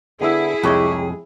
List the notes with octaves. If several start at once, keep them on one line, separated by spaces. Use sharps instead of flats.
D3 B3 E4 G#4 E5
C2 F2 G#3 G4 C#5 D#5